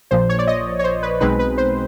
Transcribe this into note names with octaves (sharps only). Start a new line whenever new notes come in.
A#1 A#2 F3 C5
C#5
D5
D#5
C#5
C5
B4
B1 B2 G#3 C4 D#4 B4
B4
C5